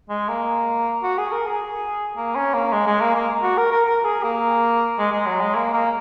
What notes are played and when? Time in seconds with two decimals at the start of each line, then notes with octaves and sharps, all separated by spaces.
0.09 G#3
0.29 A#3
1.03 F#4
1.18 G#4
1.32 A#4
1.46 G#4
2.16 A#3
2.35 C#4
2.54 A#3
2.73 G#3
2.87 G#3
3.01 A#3
3.15 A#3
3.43 F#4
3.57 A#4
3.72 A#4
3.86 A#4
4.05 G#4
4.23 A#3
4.98 G#3
5.12 G#3
5.26 F#3
5.40 G#3
5.55 A#3
5.73 A#3